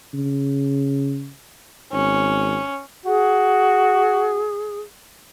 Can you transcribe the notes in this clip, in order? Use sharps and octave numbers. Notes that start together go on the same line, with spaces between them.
C#3
G#1 C#4
F#4 G#4